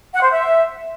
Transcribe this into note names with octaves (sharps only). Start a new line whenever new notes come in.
F#5
C5
E5